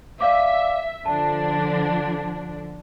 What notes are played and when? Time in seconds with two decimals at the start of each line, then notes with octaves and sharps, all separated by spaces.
0.21 D5 E5 F5 D6
1.06 D3 F3 D4 A5